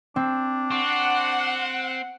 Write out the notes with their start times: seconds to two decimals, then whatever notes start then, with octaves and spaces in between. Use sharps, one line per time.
0.16 C4 D4
0.71 C4 F#5 C#6 D7